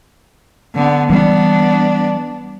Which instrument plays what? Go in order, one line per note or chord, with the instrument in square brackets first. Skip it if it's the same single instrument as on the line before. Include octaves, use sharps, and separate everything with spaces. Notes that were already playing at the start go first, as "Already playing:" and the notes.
[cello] D3 B3
[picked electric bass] E3 G3 [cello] B3 D4